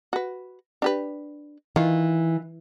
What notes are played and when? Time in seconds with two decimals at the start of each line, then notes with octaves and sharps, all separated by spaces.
0.13 F#4 B4
0.82 D4 G4 B4
1.76 D#3 E3 F4